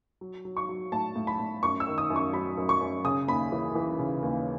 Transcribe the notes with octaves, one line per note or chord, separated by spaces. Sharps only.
F#3
F#3
C#6
F#3
A2 A5
A2
B5
A2
F#2 C#6
E6
D#3
D#6
F#2
C#6
F#3 B5
F#2
C#6
F#2
C#3 D#6
D#2 B5
E3
E3
C#3
D#2